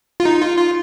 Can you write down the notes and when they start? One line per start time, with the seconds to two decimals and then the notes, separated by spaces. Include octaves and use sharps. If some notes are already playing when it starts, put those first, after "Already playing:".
0.20 F4
0.25 D#4
0.42 F4
0.58 F4